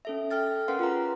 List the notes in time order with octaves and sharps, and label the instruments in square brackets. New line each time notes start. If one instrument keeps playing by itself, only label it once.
[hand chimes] C#4 A4 E5
A4 G5 F6 A6
C#4 A#4 B4 F5 F#5 C6
F4 G#4 B4 A#5